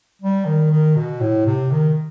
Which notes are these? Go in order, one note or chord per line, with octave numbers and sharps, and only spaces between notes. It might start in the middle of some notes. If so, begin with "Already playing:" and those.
G3
D#3
D#3
B2
A2
C3
D#3